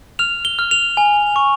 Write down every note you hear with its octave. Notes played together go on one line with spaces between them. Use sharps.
F6 F7
G7
F6
F7
G#5
C#6